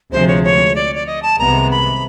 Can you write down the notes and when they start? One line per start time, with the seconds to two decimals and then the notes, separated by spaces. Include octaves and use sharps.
0.12 D2 C3 F3 G#3 C5
0.28 C#5
0.44 C#5
0.75 D5
0.95 D5
1.07 D#5
1.23 A5
1.39 C2 C3 D#3 G#3 B3 A#5
1.71 B5